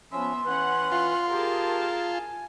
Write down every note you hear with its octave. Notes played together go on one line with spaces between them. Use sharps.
F3 B3 C#4 E5 C6
E3 C#4 B4 F#5
F4
G4 G#4 A#4 G5 A5
G#5